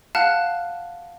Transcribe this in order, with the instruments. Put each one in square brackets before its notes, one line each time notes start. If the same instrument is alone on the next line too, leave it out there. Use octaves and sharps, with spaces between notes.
[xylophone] F5 F#5 A5 F6 F#6